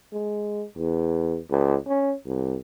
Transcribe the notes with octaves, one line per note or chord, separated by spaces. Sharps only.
G#3
E2
C#2
C#4
C2